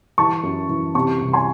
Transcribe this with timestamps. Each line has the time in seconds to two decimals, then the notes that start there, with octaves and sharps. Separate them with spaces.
0.18 E3 A5 C#6
0.43 F#2
0.69 E3
0.94 C3 A5 C#6
1.21 C2
1.33 G#5 C6